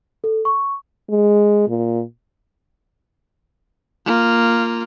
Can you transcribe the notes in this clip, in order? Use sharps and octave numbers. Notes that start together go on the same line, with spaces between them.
A4
C#6
G#3
A#2
A#3 F4